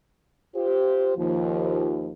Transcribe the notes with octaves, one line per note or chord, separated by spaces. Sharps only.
F4 G4 C5
D#2 F3